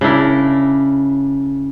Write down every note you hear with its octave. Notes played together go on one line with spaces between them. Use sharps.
C#3 D4 E4 A#4